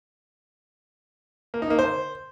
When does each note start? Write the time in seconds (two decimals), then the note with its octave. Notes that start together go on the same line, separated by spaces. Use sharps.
1.54 A#3
1.62 D#4
1.70 A#3
1.79 C5